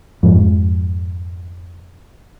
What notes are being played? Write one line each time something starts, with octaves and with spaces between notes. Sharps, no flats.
F2 G#2